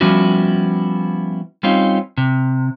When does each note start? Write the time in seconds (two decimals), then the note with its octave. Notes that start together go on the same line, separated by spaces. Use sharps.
0.01 F3 G3 B3 C#4 E4 F#4
1.63 G3 C4 C#4 D#4 F4
2.18 C3